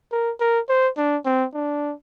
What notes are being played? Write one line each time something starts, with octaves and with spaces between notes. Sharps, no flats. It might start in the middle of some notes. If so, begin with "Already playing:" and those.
A#4
A#4
C5
D4
C4
D4